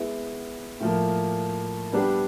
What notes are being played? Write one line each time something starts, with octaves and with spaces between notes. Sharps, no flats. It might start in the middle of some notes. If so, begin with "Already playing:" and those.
Already playing: G#3 B3 E4
A2 F3 A#3
G3 B3 D4 G4 B4